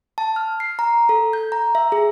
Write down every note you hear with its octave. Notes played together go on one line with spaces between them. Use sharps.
A5
F6
C7
A#5
A4
G6
A#5
E5
G#4